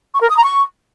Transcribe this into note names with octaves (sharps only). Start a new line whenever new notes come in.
C#6
A#4
D#6
A#5
C#6